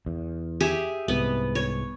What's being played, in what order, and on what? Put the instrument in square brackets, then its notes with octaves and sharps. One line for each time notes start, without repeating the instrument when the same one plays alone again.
[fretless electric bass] E2
[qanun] G4 G#4 E5
[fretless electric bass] C2 G#2 C3 [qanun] B3
[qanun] C#5